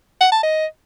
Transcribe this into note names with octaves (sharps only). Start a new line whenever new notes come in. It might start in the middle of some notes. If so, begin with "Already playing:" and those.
F#5
A5
D#5